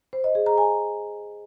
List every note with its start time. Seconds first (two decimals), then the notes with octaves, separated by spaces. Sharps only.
0.13 C5
0.24 D#5
0.35 G#4
0.46 A#5
0.58 G#5